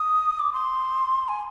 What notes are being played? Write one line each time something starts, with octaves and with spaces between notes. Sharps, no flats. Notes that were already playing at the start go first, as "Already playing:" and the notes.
Already playing: D#6
D6
C6
G#5